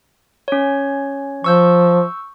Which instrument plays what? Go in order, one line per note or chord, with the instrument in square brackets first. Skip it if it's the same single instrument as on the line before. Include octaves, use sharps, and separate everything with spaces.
[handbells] C#4 C#5
[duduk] F3 [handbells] C#6 E6 G6